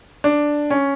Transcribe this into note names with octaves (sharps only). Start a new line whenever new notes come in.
D4
C#4